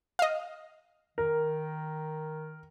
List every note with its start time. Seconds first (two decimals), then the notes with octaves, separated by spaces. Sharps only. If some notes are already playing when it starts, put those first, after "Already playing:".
0.19 D#5 F5
1.18 D#3 A#4